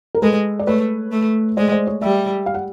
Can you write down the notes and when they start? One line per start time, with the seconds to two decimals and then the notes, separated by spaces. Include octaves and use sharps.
0.15 A#4
0.22 G#3 A4 B4
0.59 D5
0.67 A3 B4 C#5
1.12 A3
1.57 G#3 C5 D5
1.72 C5 D5
1.87 C#5 D#5
2.02 G3 D5 E5
2.46 F5
2.54 F#5